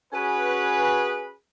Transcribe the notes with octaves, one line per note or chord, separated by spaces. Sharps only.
C#4 F#4 G#4 B4